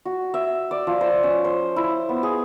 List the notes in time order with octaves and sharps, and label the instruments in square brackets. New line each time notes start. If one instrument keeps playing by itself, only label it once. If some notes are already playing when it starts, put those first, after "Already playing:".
[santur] F#4
E5
D5
F3
C5
C#4
C5
E4
B3
G#4